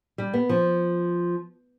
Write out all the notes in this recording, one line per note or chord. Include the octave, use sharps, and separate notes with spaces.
G3
B3
F3